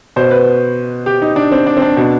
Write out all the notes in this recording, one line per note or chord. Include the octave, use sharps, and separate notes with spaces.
B2 C5
B4
G4
D#4
D4
C4
D4
C4
D4
B2